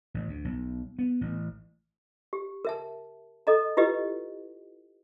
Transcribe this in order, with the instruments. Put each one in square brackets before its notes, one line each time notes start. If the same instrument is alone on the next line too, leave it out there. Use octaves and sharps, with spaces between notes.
[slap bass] A1
D2
B1
B3
A1
[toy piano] G4
A#4 E5 A5
A4 D#5 A#5
E4 F4 G4 B4 D#5